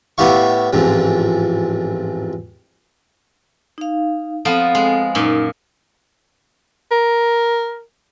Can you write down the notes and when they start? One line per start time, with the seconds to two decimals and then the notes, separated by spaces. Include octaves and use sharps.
0.18 A2 B3 E4 G4 F5 C#6
0.73 A1 F2 G#2
3.78 D#4 F5
4.45 F3 B3 C4 F4 A4
4.75 G#3
5.15 F#2 A#2 D#4
6.92 A#4